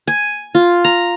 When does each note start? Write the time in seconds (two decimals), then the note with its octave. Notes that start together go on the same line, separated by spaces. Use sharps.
0.07 G#5
0.55 F4
0.84 A#5